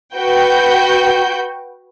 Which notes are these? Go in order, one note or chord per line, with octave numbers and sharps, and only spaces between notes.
F#4 B4 G5 G6